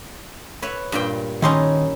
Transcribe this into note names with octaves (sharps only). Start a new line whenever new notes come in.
B4 C#5 E5
G2 A#2 G5
D#3 C#4 D#4 E4 C6